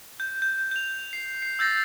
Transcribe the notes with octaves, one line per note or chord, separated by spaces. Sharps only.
G6
G6
G6 F7
C7
C7
E6 G6 A6 A#6 C7